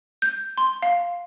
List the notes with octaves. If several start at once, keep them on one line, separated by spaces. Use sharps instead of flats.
G6
C6
F5